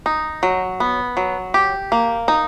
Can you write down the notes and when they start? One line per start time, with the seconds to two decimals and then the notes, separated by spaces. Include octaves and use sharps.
0.06 D#4
0.43 F#3
0.80 B3
1.17 F#3
1.54 G4
1.92 A#3
2.28 D#4